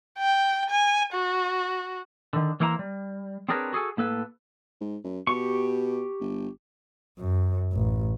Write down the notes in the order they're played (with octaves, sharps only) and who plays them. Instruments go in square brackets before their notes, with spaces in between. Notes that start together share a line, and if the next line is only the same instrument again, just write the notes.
[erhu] G5
G#5
F#4
[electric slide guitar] D3 D#3
E3 A#3 E4 C5 G5 A#5
G3
C4 D4 G#4 A#4 B4 C#5
F#4 G#4 A4 G#5
A2 A#3 A4 B4
[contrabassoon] G#2
F#2
[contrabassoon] B2 [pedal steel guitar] G4 C#6
[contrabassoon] G1
[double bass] F#2
A1